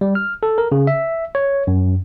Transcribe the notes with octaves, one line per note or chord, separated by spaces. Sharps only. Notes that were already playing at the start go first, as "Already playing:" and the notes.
G3
F6
A4
A#4
C#3
E5
C#5
F#2